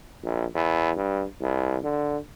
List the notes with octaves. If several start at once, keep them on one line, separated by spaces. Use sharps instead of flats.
A#1
E2
G2
C2
D3